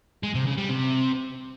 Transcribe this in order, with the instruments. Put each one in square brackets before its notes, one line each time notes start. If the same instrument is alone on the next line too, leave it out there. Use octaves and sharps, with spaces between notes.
[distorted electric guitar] G#3
C3
C#3
G3
C3